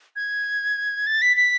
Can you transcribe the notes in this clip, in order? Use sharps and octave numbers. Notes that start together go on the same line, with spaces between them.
G#6
A6
B6
B6